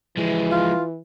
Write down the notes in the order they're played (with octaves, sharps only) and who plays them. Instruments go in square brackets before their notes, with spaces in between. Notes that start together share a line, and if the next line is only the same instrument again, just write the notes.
[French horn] E3 [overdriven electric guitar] F3 G#3
[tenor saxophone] F4